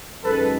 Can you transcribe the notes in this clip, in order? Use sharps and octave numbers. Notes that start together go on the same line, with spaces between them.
F#2 D#3 G#3 A4 B4